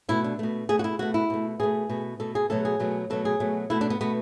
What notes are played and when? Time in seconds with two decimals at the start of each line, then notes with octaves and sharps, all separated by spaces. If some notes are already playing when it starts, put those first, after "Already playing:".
0.09 B2 A3 E4
0.24 D4
0.39 B2 A3
0.69 B2 A3 G#4
0.79 F#4
0.84 E4
0.99 B2 A3 F#4
1.14 E4
1.30 B2 A3
1.60 B2 A3 G#4
1.90 B2 A3
2.20 B2 A3 A4
2.35 G#4
2.50 B2 F#3 A3 A4
2.65 G#4
2.80 B2 F#3 A3
3.10 B2 F#3 A3 A4
3.25 G#4
3.40 B2 F#3 A3
3.70 B2 A3 E4
3.81 D4
3.90 B3
4.01 B2 A3 B3